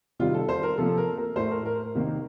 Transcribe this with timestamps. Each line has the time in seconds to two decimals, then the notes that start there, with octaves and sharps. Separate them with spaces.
0.19 C3 D#3 G3 F4
0.34 A4
0.49 C5
0.63 A#4
0.78 C3 F3 A#3 A4
0.98 A#4
1.17 A#4
1.36 A2 A3 C5
1.51 A#4
1.66 A#4
1.95 C3 D#3 A#3